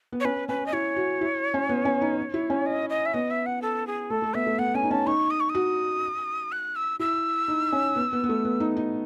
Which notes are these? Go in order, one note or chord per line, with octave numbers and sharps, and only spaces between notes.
B3
C#5
C#4 B4
C#4 B4
D#5
E4 C#5
F#4
E4
C#4
B3
C#4
D#4
E4
C#4
D#5
D#5
E5
B3 D#5
E5
F#5
A4
G#4
A3 A4
A3
B3 E5
A3
B3 F#5
C#4 G#5
D#4
C#4 A5
D#4 C#6
D#6
C#6
D#6
F#4
F#6
E6
E4 E6
D#4
C#4
B3
B3
B3
A3
B3
D#4
D#4